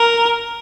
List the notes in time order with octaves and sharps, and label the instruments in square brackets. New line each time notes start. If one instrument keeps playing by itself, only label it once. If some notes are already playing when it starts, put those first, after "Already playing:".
Already playing: [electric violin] A#4